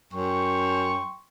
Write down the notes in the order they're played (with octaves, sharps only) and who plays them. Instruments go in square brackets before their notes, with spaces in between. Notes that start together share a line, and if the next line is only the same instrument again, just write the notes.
[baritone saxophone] F#2 [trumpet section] G5 C6 C#6